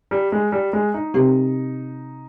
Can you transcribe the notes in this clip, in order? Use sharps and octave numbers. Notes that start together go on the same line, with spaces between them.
G3
G#3
G3
G#3
D#4
C3 G3 C4 G4